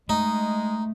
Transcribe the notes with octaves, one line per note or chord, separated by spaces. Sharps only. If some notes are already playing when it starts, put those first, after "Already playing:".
G#3 A3 D#4